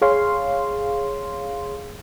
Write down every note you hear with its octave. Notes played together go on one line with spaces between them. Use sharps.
G#4 C#5 F5 C6